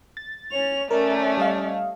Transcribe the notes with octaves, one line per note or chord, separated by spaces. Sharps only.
A6
C#4 C#5 F7
A3 C#4 A#4 C#5 D5
G3 D#5 F5